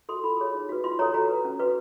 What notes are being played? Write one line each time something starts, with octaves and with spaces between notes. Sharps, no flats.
F#4 A4 C6
F4 B5
G#4 C#5
D#4
F#4 B4
F4 C6
A4 C#5 A#5
F#4 A#5
B4
C#4
F#4 B4